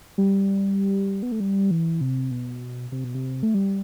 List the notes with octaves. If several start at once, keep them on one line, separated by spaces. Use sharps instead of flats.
G3
B3
A3
G3
E3
C3
B2
C3
B2
C3
A3
G3